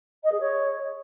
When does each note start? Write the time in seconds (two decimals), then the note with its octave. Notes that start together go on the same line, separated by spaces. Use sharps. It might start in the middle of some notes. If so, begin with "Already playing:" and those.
0.23 D#5
0.31 G#4
0.40 C#5